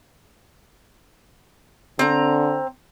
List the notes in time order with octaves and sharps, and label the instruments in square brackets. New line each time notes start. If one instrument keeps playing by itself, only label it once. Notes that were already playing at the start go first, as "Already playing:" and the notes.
[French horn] D3 [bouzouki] C4 A#5